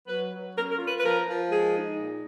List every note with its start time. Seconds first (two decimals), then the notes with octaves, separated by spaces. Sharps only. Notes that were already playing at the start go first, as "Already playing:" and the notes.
0.07 F#3 B4
0.31 F#3
0.56 C#4 A#4
0.71 A#4
0.79 F4
0.87 B4
0.98 B4
1.02 F3 A#4
1.27 F3
1.50 G#3 G#4
1.74 D#4
1.98 A#2